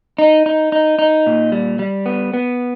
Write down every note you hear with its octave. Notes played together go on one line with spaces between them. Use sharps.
D#4
D#4
D#4
D#4
A#2
G3
G3
B3
B3